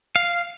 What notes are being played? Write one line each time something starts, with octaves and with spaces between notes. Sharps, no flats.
F5